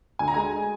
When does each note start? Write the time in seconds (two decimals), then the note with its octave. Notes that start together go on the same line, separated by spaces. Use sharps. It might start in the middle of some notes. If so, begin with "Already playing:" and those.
0.19 D2 G#5
0.28 A#5
0.34 G#3 G#5